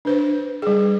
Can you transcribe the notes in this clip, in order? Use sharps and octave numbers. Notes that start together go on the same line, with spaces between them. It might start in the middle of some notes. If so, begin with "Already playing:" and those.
D4 B4 C5
G3 G#4